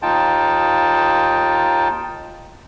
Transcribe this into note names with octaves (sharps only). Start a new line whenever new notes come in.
D#2 D#4 F4 G5 A5